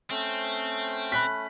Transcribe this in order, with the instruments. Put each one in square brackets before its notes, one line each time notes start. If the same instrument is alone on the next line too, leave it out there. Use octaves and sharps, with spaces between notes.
[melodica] A3 C#4 [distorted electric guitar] C4
[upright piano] B5 F#6 B6